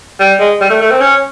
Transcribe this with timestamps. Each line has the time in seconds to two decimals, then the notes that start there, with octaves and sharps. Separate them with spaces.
0.20 G3
0.40 G#3
0.61 G3
0.70 A3
0.81 A3
0.91 C4
1.00 C#4